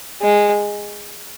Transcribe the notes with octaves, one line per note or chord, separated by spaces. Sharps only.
G#3